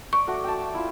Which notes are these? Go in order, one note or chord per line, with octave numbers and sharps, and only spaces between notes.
D5 C#6 D6
A3 F#4
G5 A5
E4 F4